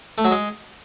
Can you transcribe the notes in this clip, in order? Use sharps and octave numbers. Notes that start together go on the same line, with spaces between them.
A3
F#3
G#3